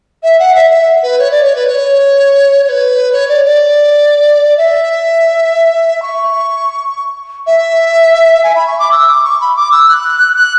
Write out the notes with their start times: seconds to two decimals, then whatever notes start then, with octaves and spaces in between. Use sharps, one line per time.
0.23 E5
0.39 F#5
0.55 E5
0.70 E5
1.03 B4
1.19 C#5
1.31 D5
1.44 C#5
1.55 B4
1.67 C#5
2.64 C#5
2.69 B4
3.12 C#5
3.29 D5
3.45 D5
4.57 E5
6.02 C#6
7.47 E5
8.43 G#5
8.55 B5
8.67 C#6
8.79 D6
8.92 E6
9.08 D6
9.24 C#6
9.40 B5
9.56 D6
9.71 E6
9.88 F#6
10.36 F#6